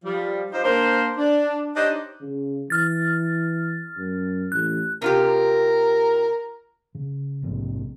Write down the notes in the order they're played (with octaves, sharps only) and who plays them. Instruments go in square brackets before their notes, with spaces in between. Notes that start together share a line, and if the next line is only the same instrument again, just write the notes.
[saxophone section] F3 G3
D#4 F4 G4 C5
A#3 D4 A#4 C5
D4
D4 D#4 G4 C5 C#5 D#5
[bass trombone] C#3
[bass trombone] E3 [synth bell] F6 A6
[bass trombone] F#2
[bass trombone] A1 [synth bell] F#6
[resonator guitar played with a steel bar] C3 F4 G4 [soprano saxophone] A#4
[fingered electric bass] C#3
A#1 G#2 C3 C4